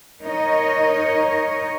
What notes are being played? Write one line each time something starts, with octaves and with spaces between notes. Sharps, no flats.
D#4 A#4 C#5 D#5